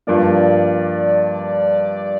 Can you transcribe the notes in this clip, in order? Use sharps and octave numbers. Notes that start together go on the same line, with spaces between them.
G2 F3 A#3 D5